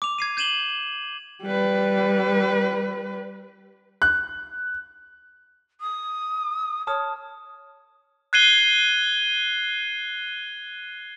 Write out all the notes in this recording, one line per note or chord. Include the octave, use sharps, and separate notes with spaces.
D6 F7
G#6 C7 D#7
G6 G#6 D#7 E7 F#7 G7
G3 B4
F#6
D#6
C#5 A5 D#6 F6
F#6 G#6 C7 D#7 G7